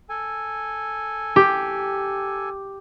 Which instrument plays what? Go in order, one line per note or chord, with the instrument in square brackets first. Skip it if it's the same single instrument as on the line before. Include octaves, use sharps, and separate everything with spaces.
[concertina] A4 G#5
[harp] G4